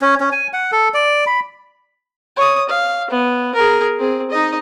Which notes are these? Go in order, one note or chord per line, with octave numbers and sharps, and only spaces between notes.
C#4
C#4
G#5
F#5
A4
D5
B5
C#5 D#6
F5
B3
G#4 A#4
C4 G#4
D#4 D#5